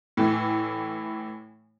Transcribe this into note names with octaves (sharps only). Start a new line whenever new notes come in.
A2 E3